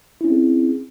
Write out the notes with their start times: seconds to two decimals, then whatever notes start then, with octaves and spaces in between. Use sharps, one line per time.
0.21 E4
0.24 C#4
0.28 C4
0.32 G#4